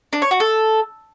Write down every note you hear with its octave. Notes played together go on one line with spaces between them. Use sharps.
D4
C#5
F#4
A4